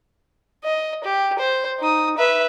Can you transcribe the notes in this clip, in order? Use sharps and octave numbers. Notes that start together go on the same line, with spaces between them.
D#5
G4
C5
D#4 D#6
B4 E5